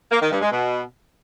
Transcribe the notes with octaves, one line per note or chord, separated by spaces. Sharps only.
A#3
D#3
G2
G#3
B2